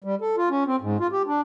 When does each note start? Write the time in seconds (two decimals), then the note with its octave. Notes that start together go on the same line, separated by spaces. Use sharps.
0.04 G3
0.21 A4
0.37 F4
0.50 C#4
0.67 C4
0.82 G#2
1.00 F4
1.12 G4
1.27 D4